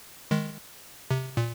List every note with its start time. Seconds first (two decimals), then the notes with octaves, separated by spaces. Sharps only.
0.31 D#3 G#3
1.11 C3
1.37 A#2